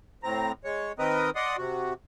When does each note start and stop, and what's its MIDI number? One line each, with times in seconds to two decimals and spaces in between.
0.23 0.52 45
0.23 0.52 60
0.23 0.52 82
0.64 0.92 56
0.64 0.92 73
0.99 1.30 51
0.99 1.30 60
0.99 1.30 70
0.99 1.30 71
0.99 1.30 75
0.99 1.30 87
1.36 1.56 74
1.36 1.56 75
1.36 1.56 78
1.36 1.56 84
1.36 1.56 87
1.58 1.94 48
1.58 1.94 66